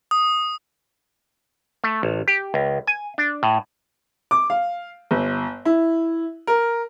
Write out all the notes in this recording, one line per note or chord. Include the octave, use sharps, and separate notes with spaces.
D#6
A3
A1
G4
C#2
G#5
D4
A2
D6
F5
G1
E4
A#4